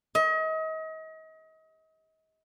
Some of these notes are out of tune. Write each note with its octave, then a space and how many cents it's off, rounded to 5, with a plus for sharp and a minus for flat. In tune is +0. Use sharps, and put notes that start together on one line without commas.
D#5 +35